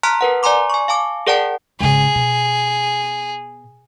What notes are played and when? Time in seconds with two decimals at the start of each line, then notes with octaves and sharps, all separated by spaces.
0.03 A5 A#5 C6 F6 F#6 B6
0.21 A#4 B4 F#5
0.43 D5 G#5 A#5 C6 D6
0.70 G#5 C#6
0.88 F5 G#5 A5 D6
1.27 G#4 A#4 D5 F#5 G5 A5
1.80 G#1 C#3 G#4
2.15 B2